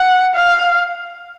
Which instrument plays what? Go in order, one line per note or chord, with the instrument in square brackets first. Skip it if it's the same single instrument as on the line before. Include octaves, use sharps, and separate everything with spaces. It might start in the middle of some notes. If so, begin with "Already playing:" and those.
Already playing: [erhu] F#5
F5